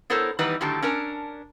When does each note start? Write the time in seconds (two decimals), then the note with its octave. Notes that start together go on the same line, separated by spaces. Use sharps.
0.10 B3 E4 A4 A#4 C5 C#5
0.39 D#3 E3 G3 B3 D#4 B4
0.61 A2 D3 D#3 F#3 G4 A5
0.82 C#4 D4 A#4 A5